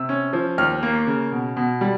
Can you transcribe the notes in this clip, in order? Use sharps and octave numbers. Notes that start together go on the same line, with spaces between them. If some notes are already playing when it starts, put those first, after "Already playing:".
Already playing: C3 E6
C#4
F3
D#2 F6
A#3
C#3
B2
B2
G3